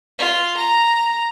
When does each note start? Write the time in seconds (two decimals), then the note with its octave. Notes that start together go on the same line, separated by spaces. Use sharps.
0.19 F4
0.57 A#5